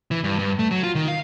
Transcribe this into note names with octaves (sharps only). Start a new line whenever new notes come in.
E3
G2
G2
A3
F#3
F4
D#3
F5